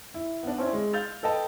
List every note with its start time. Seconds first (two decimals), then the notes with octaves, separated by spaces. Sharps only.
0.14 E4
0.43 B3 D4
0.58 C4 C#4 E4
0.73 G#3
0.93 F5 G6 A6 F7
1.23 A4 B4 D#5 G5 A5